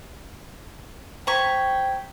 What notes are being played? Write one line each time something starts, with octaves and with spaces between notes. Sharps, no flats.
C5 G5 A#5 C#6 G#6 B6